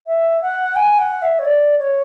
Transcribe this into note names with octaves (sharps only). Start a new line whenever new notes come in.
E5
F#5
G#5
F#5
E5
C#5
D5
C#5